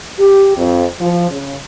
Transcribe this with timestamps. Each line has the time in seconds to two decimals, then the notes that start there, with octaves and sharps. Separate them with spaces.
0.19 G4
0.57 F2
1.00 F3
1.30 C#3